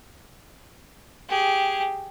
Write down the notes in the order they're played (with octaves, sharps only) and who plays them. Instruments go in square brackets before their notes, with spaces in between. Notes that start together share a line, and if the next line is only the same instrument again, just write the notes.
[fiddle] G4 G#4